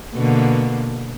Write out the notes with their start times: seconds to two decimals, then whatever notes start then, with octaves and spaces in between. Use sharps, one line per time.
0.15 B2 D3 A#3